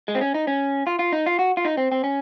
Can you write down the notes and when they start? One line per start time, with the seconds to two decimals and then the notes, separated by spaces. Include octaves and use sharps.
0.08 G#3
0.15 C4
0.21 C#4
0.34 D#4
0.47 C#4
0.87 F4
0.99 F4
1.12 D#4
1.26 F4
1.39 F#4
1.57 F4
1.65 D#4
1.77 C4
1.92 C4
2.04 C#4